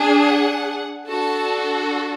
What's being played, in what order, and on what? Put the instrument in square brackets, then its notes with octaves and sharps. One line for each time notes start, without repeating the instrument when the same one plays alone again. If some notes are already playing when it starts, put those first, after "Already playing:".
Already playing: [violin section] D4 G#4
F#5
D4 F#4 A4 A5